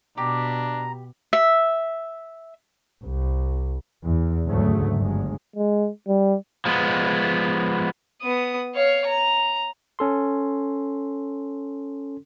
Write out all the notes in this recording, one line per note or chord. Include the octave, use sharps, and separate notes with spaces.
B2 D4 G4 A#5
E5
C2
E2
D2 G#2 C#3 F#3 A3
G1 G#3
G#3
G3
F3 G#3 B3
B3 D#6
C#5 F5
A#5
C#4 A4 C6